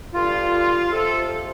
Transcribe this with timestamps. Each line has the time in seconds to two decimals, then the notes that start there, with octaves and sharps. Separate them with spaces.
0.14 G2 D3 G3 F4
0.92 F2 C3 F3 A4